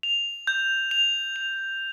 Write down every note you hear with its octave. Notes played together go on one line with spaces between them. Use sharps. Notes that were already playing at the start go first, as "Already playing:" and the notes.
F7
G6
F7
F7